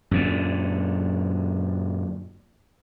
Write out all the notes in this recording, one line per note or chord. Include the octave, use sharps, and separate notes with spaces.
F#2 A#2 D3